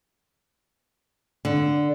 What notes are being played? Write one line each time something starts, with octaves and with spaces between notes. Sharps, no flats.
D3